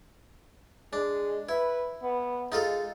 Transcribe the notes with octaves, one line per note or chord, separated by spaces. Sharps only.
G#3 D4
E4 B4
B3
G#3 D#4 F4 A4